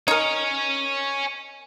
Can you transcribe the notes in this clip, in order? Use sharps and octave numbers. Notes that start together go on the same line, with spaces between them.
D#4 A#4 C#5 G#5